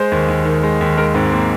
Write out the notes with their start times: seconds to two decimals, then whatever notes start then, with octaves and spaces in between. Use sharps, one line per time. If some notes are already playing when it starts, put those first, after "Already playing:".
Already playing: G#3 C5
0.12 D#2
0.28 D#2
0.45 D#3
0.63 G#3
0.81 D#2
0.97 G#3 A#4
1.15 G#2 C4
1.32 A#3